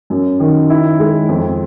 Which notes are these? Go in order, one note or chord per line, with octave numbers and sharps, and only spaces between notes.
F#2
D#3
E4
G#3
F2